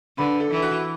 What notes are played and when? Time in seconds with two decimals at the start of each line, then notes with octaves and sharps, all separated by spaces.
0.18 D3 B4
0.40 A4
0.51 E3
0.62 F#4